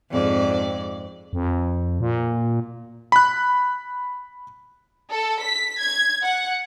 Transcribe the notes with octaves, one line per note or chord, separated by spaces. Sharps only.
F2 G#2 D5
F2
A#2
B5 F#6
A4
B6
G#6
F#5